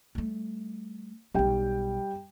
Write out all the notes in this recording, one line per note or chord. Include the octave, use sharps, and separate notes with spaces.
G3 A3
B1 F#3 G3 G5